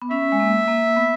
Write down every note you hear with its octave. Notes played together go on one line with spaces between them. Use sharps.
B3
C#4 E5
G#3
A#3
A#3
B3